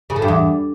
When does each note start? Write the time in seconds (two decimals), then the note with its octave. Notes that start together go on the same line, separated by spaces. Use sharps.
0.10 C#3
0.16 A2
0.22 G2
0.28 E2